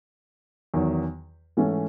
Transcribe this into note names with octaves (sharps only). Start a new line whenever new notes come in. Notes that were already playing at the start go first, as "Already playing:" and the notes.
E2 D#3 F#3
G#2 E3 A3 C#4